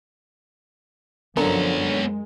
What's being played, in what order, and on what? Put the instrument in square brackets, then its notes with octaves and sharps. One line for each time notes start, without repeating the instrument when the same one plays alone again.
[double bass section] F#2 F3 [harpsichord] D3 [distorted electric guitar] B3 C#5 [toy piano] A#4 A#5
[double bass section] G#3